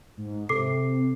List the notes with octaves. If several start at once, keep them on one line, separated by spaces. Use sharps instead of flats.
G#2
C3 A4 D6 C7